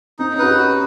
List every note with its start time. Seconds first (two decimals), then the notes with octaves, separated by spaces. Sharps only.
0.19 C4 D#4
0.34 C#4
0.39 F#4 B4
0.48 G4
0.57 F#4